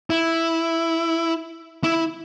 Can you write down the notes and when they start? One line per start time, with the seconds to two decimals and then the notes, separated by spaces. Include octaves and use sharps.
0.10 E4
1.84 E4